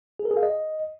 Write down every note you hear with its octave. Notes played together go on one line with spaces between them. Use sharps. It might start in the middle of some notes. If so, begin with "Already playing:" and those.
G#4
A#4
G#4
F5
D#5